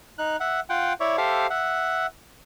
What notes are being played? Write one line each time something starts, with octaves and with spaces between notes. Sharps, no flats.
D#4 F#6
E5 F#5
F4 F#5 G5
E4 C#5 D5 E5
G4 A4 C5 E5 F5
E5 F#5